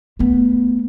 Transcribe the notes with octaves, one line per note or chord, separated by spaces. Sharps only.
A3 B3